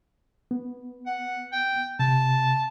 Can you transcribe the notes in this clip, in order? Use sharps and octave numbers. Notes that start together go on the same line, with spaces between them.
B3
F#5
G5
C3 A5